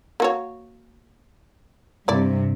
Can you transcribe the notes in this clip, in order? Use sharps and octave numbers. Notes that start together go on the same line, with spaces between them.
A#3 F#4 C#5
G2 C3 E4 D5